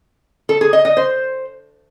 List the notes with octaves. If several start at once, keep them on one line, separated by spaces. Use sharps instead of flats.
A4
G#4
D#5
D#5
C5